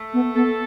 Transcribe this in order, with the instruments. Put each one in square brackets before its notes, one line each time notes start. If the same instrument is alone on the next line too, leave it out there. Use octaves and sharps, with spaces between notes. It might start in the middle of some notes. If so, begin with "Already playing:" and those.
Already playing: [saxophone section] A3
[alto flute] B3
[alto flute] B3 [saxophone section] A4